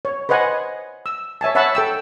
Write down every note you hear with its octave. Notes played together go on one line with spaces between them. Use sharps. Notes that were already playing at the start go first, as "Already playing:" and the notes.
C#5
B4 C5 D#5 F#5 G#5
E6
C#5 E5 G#5 A5
C#5 E5 F#5 A5 B5 E6
A4 G5 E6